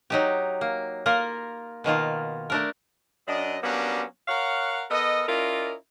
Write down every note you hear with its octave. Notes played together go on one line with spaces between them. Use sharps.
F#3 D#4 G4
A#3
A#3 F4 A#4
B2 D#3 A#3 F4
A3 D4 A#4
F#2 D4 D#5
F#3 G3 A#3 B3 C#4 D4
A#4 C#5 F5 F#5
B3 A4 A#4 D#5
C#4 E4 F4 A#4 D5 D#5